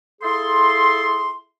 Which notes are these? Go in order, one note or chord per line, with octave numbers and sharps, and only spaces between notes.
E4 F4 G#4 A4 C6